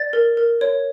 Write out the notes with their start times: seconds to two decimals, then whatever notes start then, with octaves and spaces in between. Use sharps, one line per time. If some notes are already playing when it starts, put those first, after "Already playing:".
Already playing: D5 A6
0.13 A#4
0.37 A#4
0.61 C#5